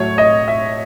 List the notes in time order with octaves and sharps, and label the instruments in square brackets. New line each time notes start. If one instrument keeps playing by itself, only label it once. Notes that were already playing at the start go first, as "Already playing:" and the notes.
Already playing: [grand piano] A2 F#3 A3 C#5
D#5
E5